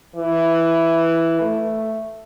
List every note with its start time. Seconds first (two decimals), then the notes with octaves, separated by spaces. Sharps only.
0.16 E3
1.41 A3